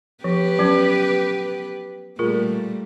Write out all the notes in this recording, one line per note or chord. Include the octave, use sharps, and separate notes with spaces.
F3 B3 G4 B4
F#3 C#4
A#2 G3 A3 F4 G#4 A#4